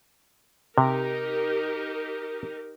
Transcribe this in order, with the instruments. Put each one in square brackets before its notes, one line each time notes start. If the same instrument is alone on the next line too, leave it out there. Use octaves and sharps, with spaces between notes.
[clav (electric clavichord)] C3 [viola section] D#4 G4 A#4